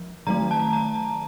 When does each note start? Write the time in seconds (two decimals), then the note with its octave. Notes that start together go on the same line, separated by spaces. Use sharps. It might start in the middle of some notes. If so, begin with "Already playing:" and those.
Already playing: F3
0.27 D#3 F#3 A3 A#5
0.51 A5
0.73 A#5